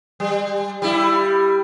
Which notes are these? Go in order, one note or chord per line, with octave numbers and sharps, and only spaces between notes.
G3
G3 E4